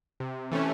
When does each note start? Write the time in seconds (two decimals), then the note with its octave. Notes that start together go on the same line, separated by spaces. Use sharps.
0.20 C3
0.51 E3 A3 C#4